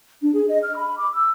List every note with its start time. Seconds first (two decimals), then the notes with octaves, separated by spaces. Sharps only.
0.22 D4
0.34 G#4
0.48 D#5
0.63 F6
0.76 B5
0.98 D6
1.15 E6